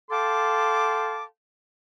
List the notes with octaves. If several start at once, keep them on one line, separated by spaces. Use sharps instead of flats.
A4 F5 G5 A5 C6 D6